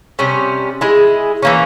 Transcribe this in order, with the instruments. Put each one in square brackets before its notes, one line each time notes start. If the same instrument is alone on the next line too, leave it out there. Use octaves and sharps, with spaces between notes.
[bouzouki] C3 G3 C#4
G#3 E4 G#4
E3 A#3 C#4